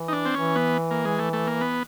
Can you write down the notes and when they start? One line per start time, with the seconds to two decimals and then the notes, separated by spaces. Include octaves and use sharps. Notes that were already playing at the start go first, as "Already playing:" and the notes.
Already playing: E3
0.08 D#4
0.13 D4
0.26 C4
0.34 E3 C#4
0.56 B3
0.91 A#3
1.05 G#3
1.19 A3
1.33 A3
1.47 A#3
1.61 B3